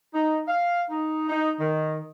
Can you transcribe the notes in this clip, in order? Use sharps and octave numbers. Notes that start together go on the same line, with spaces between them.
D#4
F5
D#4
D#4
D#3